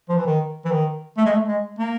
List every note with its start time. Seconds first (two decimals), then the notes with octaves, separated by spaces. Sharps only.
0.09 F3
0.17 E3
0.26 D#3
0.65 E3
0.72 D#3
1.18 A3
1.26 G#3
1.32 A3
1.48 G#3
1.79 A#3